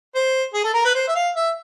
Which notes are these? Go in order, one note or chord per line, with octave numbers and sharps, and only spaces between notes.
C5
G#4
A4
A#4
B4
C5
E5
F5
E5